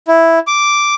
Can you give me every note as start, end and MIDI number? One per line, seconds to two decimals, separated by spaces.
0.08 0.39 64
0.47 0.95 86